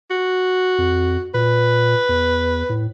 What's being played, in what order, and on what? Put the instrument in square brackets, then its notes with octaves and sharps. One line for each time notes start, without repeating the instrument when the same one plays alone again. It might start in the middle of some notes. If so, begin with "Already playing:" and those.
[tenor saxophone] F#4
[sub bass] F2
[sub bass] A#2 [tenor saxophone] B4
[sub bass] E2
A2